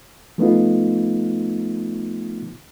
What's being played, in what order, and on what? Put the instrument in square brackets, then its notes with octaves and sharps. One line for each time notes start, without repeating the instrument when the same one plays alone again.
[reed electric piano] F3 A3 B3 D#4 F4